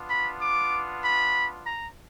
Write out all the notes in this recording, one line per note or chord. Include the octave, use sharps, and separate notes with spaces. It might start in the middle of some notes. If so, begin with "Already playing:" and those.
Already playing: B3 D4 F4
B5
D6
B5
A#5